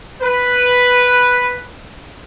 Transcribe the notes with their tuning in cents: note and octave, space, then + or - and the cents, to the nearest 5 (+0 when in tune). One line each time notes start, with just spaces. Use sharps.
B4 +0